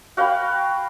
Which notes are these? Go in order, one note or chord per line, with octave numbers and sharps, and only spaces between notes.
F#4 F5 G5 B5